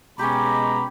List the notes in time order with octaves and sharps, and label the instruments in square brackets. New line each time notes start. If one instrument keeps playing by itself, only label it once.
[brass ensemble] B2 G#3 A#5 [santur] C#4 G4 [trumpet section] B5 [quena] D6